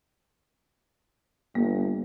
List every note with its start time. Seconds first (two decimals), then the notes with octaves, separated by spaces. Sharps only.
1.55 G1 A#3